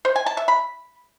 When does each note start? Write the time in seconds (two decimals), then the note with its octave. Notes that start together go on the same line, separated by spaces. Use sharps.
0.05 C5
0.16 G#5
0.26 A5
0.37 E5
0.48 B5